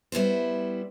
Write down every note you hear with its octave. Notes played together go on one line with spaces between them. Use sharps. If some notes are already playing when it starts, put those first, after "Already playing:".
G3 B3 E4 C5